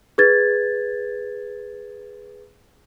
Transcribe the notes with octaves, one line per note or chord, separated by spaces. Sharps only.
G#4 B4 G#6 A6